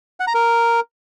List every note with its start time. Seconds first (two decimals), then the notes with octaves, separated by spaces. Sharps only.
0.20 F#5
0.27 A#5
0.35 A#4